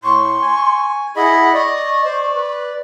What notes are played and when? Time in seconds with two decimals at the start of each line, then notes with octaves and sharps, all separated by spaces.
0.04 A2 C6 C#6
0.42 G#5
1.16 E4 G#4 D#5 F#5 B5
1.53 D5 D#5 C#6
2.04 C5
2.33 B4